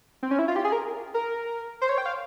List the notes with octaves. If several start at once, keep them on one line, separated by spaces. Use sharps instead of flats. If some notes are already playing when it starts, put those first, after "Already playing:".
C4
C#4
E4
F4
G4
G#4
A#4
A#4
C5
C#5
G5
F5